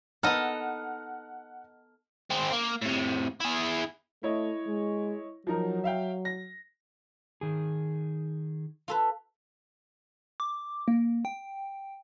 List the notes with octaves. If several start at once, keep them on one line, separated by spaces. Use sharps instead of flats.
B3 D#4 A4 D#5 F#5 F6
G#3 C4
A#3
A2 C3
E4 G#4
A3 E4 C#5 D#5
G#3
F3 F#3 D#4 A#4
E5 F5 G5
A#6
D#3 G#4
F4 A4 B4
D6
A#3
G5